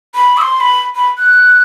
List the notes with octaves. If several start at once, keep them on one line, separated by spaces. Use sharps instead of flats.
B5
E6
C6
B5
B5
F#6